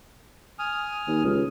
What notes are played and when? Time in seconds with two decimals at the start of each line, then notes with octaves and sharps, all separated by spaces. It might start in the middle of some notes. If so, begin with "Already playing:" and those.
0.59 G#5 D#6 F6
1.08 D#2
1.24 C#2